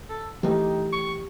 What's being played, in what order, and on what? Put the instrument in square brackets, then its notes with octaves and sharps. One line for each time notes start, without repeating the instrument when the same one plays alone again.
[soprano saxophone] A4
[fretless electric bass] E3 A3 [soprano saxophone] D#4 [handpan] G4
[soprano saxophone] C#6